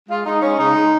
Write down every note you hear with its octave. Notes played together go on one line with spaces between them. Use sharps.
G#3 F4
G#3 D#4
G#3 C#4
C#3 D#4
G#3